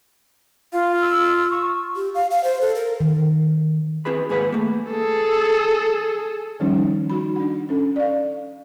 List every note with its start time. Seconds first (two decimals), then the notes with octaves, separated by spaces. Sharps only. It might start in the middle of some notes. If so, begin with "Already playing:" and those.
0.73 F4 F5
1.01 E6
1.51 C#6
1.96 G4
2.14 F5
2.31 F5
2.44 C5
2.61 A4
2.75 A#4
3.00 D#3
4.05 C4 E4 G#4 B4 B5
4.29 D#2 G#2 G#4 B4 F#5 B5
4.52 A3 A#3
4.91 G#4 A4
6.60 D#3 F3 G3 C#4 D#4
7.10 D#4 F#4 B5
7.36 D4 F#5
7.69 C#4 A4
7.96 D5 F5